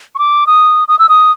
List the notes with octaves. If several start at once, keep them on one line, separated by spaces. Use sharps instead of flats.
C#6
D6
D#6
D#6
E6
D#6